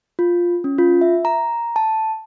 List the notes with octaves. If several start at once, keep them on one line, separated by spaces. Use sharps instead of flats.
F4
C#4
F4
E5
A#5
A5